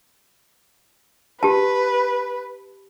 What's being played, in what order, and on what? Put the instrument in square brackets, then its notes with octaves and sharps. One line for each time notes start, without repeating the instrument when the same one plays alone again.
[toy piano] G4 A5 [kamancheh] B4